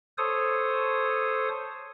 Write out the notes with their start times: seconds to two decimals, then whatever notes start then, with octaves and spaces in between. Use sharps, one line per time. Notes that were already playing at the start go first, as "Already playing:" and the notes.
0.18 A4 C5 C#5 D#6